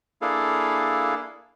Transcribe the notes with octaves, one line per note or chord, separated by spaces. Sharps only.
A#3 D4 E4 G#4 A4 F5